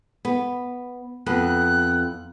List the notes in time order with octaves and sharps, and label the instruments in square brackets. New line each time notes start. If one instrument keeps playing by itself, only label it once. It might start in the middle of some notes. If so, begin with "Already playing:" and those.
[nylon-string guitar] B3
[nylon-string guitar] F2 B3 [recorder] F#6